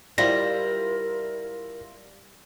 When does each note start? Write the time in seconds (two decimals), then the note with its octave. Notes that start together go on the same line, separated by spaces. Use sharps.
0.18 G3 E4 F4 A#4 C5 A#6